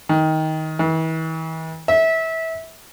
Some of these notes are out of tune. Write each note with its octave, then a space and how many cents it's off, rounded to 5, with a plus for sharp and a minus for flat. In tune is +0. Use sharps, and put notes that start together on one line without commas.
D#3 +15
E3 -40
E5 -20